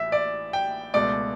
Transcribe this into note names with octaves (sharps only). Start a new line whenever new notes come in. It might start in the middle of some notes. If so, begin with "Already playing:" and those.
Already playing: A1 A2 E3 E5
D5
G5
C#2 B2 A3 D5